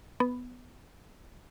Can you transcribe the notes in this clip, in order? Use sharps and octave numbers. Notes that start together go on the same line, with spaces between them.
B3